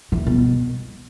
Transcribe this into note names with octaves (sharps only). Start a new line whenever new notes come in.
E3
B2